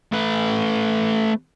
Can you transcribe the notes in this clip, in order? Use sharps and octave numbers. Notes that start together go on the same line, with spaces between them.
A3 B4